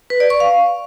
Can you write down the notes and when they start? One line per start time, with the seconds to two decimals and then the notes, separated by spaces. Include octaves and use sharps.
0.10 B4
0.20 D5
0.30 C#6
0.40 F5